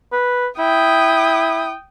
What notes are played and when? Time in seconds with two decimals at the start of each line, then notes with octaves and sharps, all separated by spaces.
0.12 B4
0.59 E4 G5 D#6